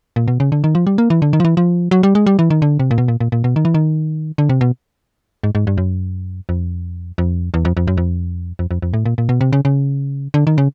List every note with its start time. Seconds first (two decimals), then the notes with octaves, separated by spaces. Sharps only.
0.16 A#2
0.28 B2
0.40 C#3
0.52 D3
0.64 D#3
0.75 F3
0.87 G3
0.98 A#3
1.10 E3
1.22 D3
1.33 D#3
1.40 F3
1.45 E3
1.57 F3
1.91 F#3
2.03 G3
2.15 G#3
2.26 G3
2.39 E3
2.50 D#3
2.62 D3
2.80 C3
2.91 A#2
2.98 B2
3.08 A#2
3.20 A#2
3.32 A#2
3.44 B2
3.56 D#3
3.65 E3
3.74 D#3
4.38 D3
4.49 C3
4.61 B2
5.44 G#2
5.55 G#2
5.67 G2
5.78 F#2
6.49 F2
7.18 F2
7.54 E2
7.65 F2
7.77 F2
7.87 F#2
7.97 F2
8.59 F2
8.71 F2
8.82 F2
8.94 A2
9.06 A#2
9.18 A#2
9.29 B2
9.41 C3
9.53 C#3
9.65 C#3
10.34 D3
10.47 D#3
10.58 C#3